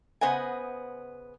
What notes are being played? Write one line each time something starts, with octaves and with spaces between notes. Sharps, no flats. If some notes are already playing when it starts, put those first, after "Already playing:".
C#3 B3 C5 D#5 F#5 G#5